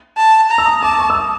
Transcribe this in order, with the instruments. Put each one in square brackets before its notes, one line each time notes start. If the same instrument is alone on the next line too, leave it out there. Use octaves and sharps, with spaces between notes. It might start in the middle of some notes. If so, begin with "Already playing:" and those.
[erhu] A5
A#5
[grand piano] E6
D#6
[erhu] A5 [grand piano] D6
[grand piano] C#6
E6
D#6